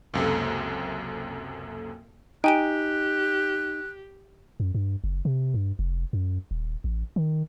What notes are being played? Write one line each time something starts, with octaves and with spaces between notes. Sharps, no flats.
C#2 F#2 C3 A#3 A4
D#4 G4 G5 G#5 F#6 D7
F#2
G2
F#1
C3
G2
F1
F#2
D#1
A1
D#3